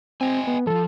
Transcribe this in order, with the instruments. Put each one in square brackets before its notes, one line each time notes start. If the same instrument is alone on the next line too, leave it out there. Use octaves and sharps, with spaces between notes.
[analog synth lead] C4 [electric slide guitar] D#5 G5 G#5
[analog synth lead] B3
[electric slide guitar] E3 F3 [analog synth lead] A4